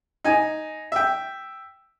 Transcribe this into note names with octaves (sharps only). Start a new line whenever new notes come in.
D#4 G#5
E5 G5